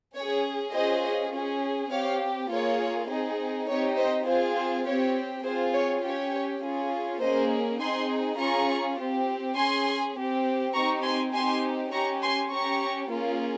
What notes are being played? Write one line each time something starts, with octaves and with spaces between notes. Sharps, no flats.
C#4 C#5
G#4
C#4 F4 G#4 C5 D#5
C#4 G#4
C4 G4 C#5 F5
A#3 F4 G#4 C#5
C4 D#4 G#4
C4 D#4 G4 C#5
C5 D#5
C4 F4 G#4 C5
C5
C4 G4 C#5
C4 F4 G#4 C5
C#5
C#4 G4 C#5
C#4 F4 G#4
A#3 C#4 G#4 C5 D#5
C4 D#4 G#4 G#5 C6
C#4 F4 G#4 A#5 C#6
C4 G4
C#4 G#4 G#5 C6
C4 G4
C4 D#4 G4 A#5 C#6
G#5 C6
C4 D#4 G4 G#5 C6
C#4 G4 A#5 C#6
G#5 C6
C#4 G4 A#5 C#6
A#3 C#4 F4 G#4